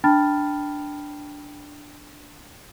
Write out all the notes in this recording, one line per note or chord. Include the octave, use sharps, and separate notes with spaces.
D4 G5 A5 B5 F6 A6